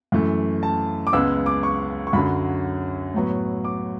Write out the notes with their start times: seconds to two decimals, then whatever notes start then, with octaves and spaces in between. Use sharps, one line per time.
0.12 F#2 E3 A3
0.63 A5
1.07 D6
1.13 C#2 C#3 G#3 B3 E6
1.46 D6
1.63 C#6
2.07 C#6
2.13 F#2 D3 F#3 B5
3.14 A2 F#3 B3
3.64 D6